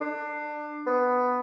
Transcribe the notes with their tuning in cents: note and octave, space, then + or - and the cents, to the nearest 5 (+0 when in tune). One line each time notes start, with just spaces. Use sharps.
D4 +25
B3 +5